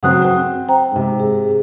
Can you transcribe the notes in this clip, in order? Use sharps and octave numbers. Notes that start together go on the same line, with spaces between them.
C#3 F#3 C4 F#5 D#6 F#6
C4
C5 G5 A#5
G#2 C3
G#4